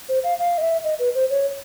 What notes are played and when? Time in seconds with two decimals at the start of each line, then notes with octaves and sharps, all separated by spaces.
0.09 C5
0.24 F5
0.39 F5
0.58 D#5
0.62 E5
0.84 D#5
0.99 B4
1.15 C5
1.30 C#5